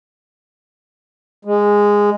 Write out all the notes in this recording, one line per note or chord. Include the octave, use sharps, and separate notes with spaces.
G#3